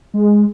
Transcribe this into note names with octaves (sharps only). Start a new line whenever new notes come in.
G#3